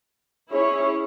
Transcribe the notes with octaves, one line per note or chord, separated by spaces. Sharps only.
C#4 E4 G#4 C#5